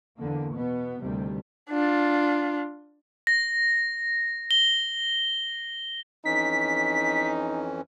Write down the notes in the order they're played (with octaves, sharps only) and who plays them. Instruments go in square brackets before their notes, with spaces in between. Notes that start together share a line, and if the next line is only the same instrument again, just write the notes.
[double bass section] E2 D3 A#3
B2 B3
D2 C3 D#3 G3
[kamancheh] D4 F4
[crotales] A#6
G7
[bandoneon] F2 E3 C#4 [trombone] D#4 [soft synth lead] B6